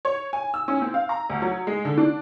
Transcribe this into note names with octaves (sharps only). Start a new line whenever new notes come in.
C#5
G#5
E6
C#4
C4
F5
A#5
D2
F#3
G#3
D3
D4